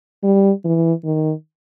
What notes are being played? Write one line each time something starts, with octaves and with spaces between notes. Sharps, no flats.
G3
E3
D#3